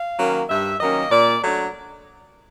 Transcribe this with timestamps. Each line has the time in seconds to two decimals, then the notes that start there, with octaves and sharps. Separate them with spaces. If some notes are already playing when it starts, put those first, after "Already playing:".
Already playing: F5
0.19 D#3 F#3 A#3 C#4
0.49 G2 E5
0.80 D#3 F#3 A#3 C#4 D#5
1.11 A#2 D5
1.42 F#3 A3 D4